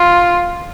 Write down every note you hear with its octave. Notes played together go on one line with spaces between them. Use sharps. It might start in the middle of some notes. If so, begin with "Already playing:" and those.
Already playing: F4